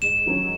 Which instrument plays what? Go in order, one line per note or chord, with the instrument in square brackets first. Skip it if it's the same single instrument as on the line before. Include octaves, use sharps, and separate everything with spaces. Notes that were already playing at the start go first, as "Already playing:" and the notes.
[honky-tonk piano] G#2 [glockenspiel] E7
[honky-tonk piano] D#3 F#3 C#4